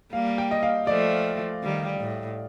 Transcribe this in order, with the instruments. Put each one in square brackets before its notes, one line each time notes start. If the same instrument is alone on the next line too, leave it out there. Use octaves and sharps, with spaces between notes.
[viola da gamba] G3 A#3 [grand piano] F5
[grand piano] G5
D#5
F5
[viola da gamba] F3 A3 [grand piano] D5
[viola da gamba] D#3 G3
A2